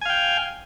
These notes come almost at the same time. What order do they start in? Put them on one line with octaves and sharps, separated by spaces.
G#5 F5 G5